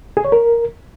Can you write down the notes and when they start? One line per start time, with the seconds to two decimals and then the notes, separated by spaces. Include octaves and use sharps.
0.17 G#4
0.25 C#5
0.32 A#4